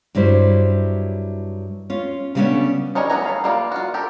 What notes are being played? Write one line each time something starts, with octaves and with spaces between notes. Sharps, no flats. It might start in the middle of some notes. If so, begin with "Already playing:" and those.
G2 F#3 G3 E4 C5
C#4 F4
C#3 G3 A3 B3 C#4 D4
G3 C#4 D#4 A#4 C#5
F#3 A3 B3 G#5 A#5
C#4 F5
G3 A#3 F4
F4 F#4
G4 A4 A#4